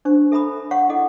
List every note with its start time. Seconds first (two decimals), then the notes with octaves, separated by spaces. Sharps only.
0.05 D4 C5 C#6
0.32 A4 E5 A#5 B5 D#6
0.71 C#5 F5 F#5 C#6
0.89 E4 G#4 A4 D#5 F#5